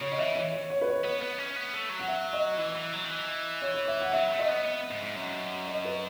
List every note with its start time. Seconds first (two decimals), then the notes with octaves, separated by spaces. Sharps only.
0.01 C#3 C#5
0.12 D#5
0.19 E3 E5
0.35 C#5
0.53 C#5
0.70 C#5
0.81 B4
0.87 C#5
1.04 B3
1.22 B3
1.38 C#4
1.56 B3
1.73 A3
1.89 F#3
1.99 F#5
2.08 E5
2.33 D#5
2.58 E3
2.76 E3
2.93 F#3
3.05 D#3
3.10 E3
3.62 C#5
3.74 C#5
3.88 E5
4.01 F#5
4.13 F#3 E5
4.30 A3
4.39 D#5
4.47 B3
4.65 B3
4.91 G#2
5.03 G#2
5.16 F#2
5.68 D#5
5.85 B4